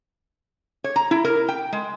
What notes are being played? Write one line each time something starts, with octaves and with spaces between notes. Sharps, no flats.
C#5
A#5
E4
A#4
G5
G#3